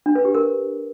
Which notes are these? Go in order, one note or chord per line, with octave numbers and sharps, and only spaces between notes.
D4
B4
G4
A#4